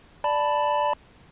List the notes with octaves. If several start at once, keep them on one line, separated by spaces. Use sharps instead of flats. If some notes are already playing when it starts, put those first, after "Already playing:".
D5 A5 B5